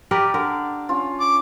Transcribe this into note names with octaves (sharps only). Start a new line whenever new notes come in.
G4 A#4 B4 D5
D3 A#4
C#4 F4
D6